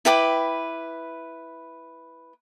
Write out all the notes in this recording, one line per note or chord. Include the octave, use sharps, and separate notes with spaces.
E4 B4 G5 D6